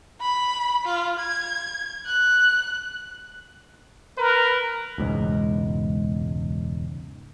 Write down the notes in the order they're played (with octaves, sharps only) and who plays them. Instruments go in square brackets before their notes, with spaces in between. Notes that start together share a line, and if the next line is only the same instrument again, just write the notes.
[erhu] B5
F4
G#6
F#6
[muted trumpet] A#4 [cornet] B4
[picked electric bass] E1 C#2 G#2